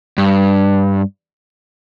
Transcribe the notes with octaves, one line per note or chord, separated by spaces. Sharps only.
G2